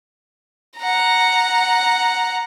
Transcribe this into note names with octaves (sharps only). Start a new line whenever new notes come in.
F#5 A#5